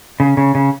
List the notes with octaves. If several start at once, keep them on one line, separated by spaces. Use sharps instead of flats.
C#3
C#3
C#3